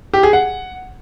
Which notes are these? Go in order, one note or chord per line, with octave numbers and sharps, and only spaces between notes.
G4
G#4
F#5